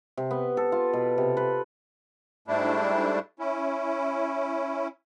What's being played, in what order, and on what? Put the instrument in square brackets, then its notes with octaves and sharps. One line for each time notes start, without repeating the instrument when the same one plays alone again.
[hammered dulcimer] C3
B3
A4
F4
B2
C3
B4
[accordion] G#2 G3 A3 D4 E4
C#4 E4